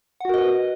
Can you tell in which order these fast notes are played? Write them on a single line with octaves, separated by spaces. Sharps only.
F#5 F#4 A#4 D#5 B4